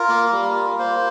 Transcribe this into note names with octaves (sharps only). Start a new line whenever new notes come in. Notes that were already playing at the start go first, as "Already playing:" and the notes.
Already playing: F4 A#4
A#3
G3
F4
A#3 C5